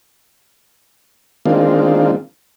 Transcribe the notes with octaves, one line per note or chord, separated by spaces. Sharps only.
D#3 G#3 A#3 C4 D4 F4